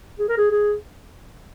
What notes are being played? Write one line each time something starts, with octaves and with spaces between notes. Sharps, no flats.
G#4
A#4
G#4
G#4